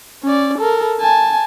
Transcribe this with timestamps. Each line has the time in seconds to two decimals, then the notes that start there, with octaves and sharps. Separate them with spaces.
0.24 C#4 D5
0.59 A4 A#4
1.00 G#5 A5